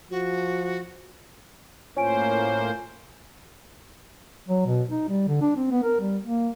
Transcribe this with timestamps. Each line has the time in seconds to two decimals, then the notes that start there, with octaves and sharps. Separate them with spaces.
0.11 F3 F#4
1.97 A2 A#3 C#4 F4 C5 G#5 D7
4.48 F#3
4.66 B2
4.90 D#4
5.08 G3
5.28 D3
5.41 D4
5.57 C4
5.71 B3
5.83 A#4
6.01 G3
6.24 A#3